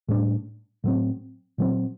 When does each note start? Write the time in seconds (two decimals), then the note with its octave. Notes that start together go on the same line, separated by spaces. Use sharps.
0.08 A2 G3 A#3 D4
0.84 A2 F#3 C4
1.58 A#2 F#3 C4